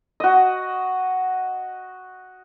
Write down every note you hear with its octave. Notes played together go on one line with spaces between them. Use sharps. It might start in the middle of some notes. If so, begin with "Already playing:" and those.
F#4 D#5